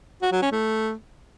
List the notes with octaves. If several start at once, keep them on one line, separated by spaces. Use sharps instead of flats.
F#4
F#3
C#4
A3